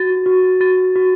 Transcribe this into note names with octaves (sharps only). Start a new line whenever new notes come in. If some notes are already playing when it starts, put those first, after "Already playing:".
Already playing: F#4 A6
F#4
F#4 A6
F#4